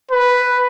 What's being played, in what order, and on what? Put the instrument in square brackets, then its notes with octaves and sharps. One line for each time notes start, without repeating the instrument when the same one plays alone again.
[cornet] B4